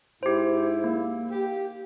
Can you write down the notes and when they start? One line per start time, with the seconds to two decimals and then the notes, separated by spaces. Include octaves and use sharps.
0.23 G#2 E4 G4 C5
0.84 A#3
1.31 G4